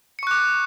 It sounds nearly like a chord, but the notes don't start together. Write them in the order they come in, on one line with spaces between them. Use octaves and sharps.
C#7 C#6 F#6 D6